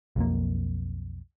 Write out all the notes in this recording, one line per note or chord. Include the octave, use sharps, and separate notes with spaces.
B1 F2 A#3